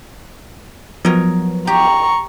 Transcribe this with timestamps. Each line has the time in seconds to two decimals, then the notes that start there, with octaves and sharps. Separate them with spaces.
1.05 F3 F#3 B3 A#4 C#5 D#5
1.67 G4 A#5 C#6